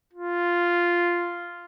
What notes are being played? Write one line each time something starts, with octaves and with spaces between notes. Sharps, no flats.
F4